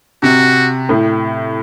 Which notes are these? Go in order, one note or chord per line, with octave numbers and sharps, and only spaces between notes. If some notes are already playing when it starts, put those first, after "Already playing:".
C3 F#4
A2